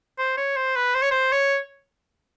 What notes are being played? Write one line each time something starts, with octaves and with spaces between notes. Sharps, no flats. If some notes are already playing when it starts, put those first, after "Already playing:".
C5
C#5
C5
B4
C5
C#5
C5
C#5